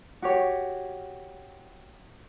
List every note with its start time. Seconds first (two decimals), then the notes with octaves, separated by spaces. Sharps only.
0.22 F#4 G4 C#5